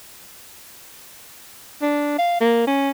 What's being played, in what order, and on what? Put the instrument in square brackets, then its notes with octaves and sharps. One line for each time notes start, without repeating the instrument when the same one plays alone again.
[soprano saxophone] D4
F5
A#3
C#4